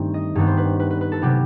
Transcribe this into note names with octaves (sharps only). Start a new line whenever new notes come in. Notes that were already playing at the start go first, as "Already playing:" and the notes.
Already playing: G2 D#3 A3 C4
D#5
G2 D#3 G3 B3
C5
B4
B4
B4
B4
A4
C3 F#3 B3 G4